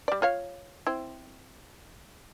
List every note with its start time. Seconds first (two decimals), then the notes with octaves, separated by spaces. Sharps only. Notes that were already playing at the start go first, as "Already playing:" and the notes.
0.08 G3 D5
0.22 F4 C#5 F5
0.87 C4 E4